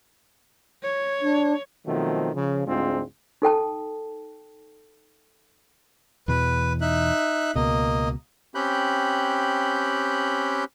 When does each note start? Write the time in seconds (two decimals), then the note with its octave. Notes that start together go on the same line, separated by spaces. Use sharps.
0.83 C#5
1.22 D4
1.87 B2 D#3 F3 F#3 A3 C4
2.34 C#3 F3
2.67 D2 G#2 G#3 C4 D4 F4
3.42 D#4 A4 G5 A5
6.28 E2 B2 E3 B4
6.81 D#4 E5 F#6
7.55 C#2 B2 A#3 D#5
8.55 C4 C#4 G4 B5 F#6 G6